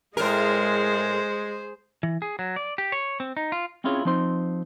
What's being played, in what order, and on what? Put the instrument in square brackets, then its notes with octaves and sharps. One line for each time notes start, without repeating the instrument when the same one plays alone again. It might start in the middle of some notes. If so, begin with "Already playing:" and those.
[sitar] A2 A#4 [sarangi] G#3 [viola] G#4 C5
[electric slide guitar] E3
G#4
F#3
D5
G4
C#5
C4
D#4
F4
[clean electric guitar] C4 C#4 E4 F4 G#4 C#5
F3 C4 D#4 C5 C6